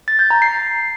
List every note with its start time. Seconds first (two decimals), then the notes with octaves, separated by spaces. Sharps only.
0.08 A6
0.19 G6
0.30 A#5
0.42 C7